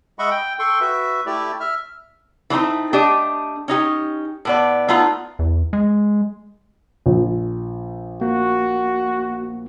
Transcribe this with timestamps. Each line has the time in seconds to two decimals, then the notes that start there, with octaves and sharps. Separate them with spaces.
0.19 G#3 D#5 E5 F#5 B5 C#6
0.30 G5
0.59 A4 G5 C6 C#6
0.81 F#4 B4 E5
1.26 A3 E4 G4 D5
1.60 E5 F6
2.50 E3 A3 C4 D#4 E4
2.93 A3 D4 G4 D#5
3.68 C#4 D#4 G4
4.45 A2 B3 D5
4.88 A3 B3 D#4 F4
5.39 E2
5.73 G#3
7.06 A#1
8.21 A#3 F#4